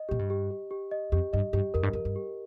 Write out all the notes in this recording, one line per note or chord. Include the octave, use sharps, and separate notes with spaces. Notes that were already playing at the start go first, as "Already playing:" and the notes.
Already playing: D#5
A#2 G4
G2
G4
G4
G4
D#5
F2 G4
G2 D#5
G2 G4
F2 A#4
G2
F2 A#4
G2
G4